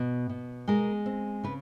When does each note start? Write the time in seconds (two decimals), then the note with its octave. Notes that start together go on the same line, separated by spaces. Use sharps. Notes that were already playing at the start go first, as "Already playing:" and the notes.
Already playing: B2
0.29 B2
0.68 G#3 A#4
1.06 C4
1.44 C#3 B4